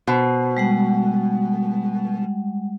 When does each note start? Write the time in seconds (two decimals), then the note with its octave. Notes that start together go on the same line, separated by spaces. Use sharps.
0.08 B2 C5
0.57 G3 G#3 F#5